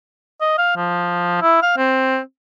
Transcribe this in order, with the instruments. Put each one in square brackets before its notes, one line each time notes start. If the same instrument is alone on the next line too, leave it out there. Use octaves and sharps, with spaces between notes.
[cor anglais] D#5
F5
F3
E4
F5
C4